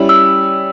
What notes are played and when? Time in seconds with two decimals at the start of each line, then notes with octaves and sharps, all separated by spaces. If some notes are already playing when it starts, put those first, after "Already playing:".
Already playing: G3 C#4 E4
0.09 E6